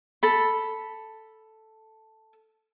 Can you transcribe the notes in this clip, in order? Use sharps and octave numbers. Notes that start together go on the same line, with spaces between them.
A4 B5